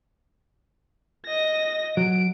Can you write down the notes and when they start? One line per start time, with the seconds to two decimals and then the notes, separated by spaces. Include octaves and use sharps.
1.25 D#5 A#6
1.97 F#3 D7